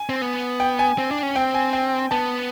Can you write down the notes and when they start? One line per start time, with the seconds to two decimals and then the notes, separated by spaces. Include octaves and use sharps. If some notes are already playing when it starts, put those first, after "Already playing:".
Already playing: G#5
0.09 C4
0.22 B3
0.60 G5
0.79 G#5
0.98 C4
1.11 D4
1.23 C#4
1.36 C4 G5
1.54 G#5
1.73 G5
2.11 B3 A5